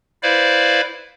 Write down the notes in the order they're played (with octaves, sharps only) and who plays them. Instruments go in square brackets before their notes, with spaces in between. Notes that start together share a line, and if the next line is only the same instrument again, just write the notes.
[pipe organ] E4 B4 C5 D5 F5